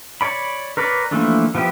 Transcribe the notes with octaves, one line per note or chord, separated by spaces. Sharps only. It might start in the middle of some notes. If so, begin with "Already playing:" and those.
C#5 D5 B5
A#4 B4 C#5 D5
E3 F3 A3 A#3 D4
F3 B3 E4 G4